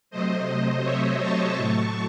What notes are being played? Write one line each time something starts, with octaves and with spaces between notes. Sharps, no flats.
C3 F#3 A3 C5 D#5
C#5 E5
A5 C#6
A2 F#3 A3